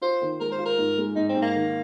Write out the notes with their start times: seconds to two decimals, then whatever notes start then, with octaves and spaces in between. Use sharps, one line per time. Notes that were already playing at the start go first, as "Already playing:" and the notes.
0.01 F4 C5
0.21 D#3
0.40 G#3 A#4
0.52 C5
0.58 F4
0.66 A#4
0.78 G#2
0.98 G#3
1.15 G#2 D#4
1.29 C4
1.35 G#2
1.42 A#3
1.55 D#3